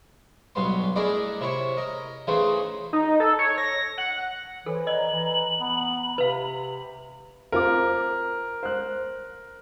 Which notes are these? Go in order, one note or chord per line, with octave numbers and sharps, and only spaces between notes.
B1 G2 B3 C#4 C6
A3 D4 E4 G#4 A#4 D#5
C3 E4 C#5
A#4 D#5
C#3 E3 A3 D#4 G#4 C5
D#4
A4
C#5
A#6
F#5
E3 A4 C5 C#5
D5 D#5 A#5 F#7
E3
B3 A#5 B5
C3 B4 F5
C4 F4 A#4 D6
C5 F#6